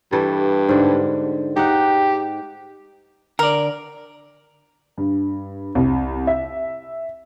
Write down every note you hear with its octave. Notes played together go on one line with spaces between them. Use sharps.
G2 E3 A4
G#2 D3
D#4 G4 F#5
D3 A#4 D5
G2
C2
E5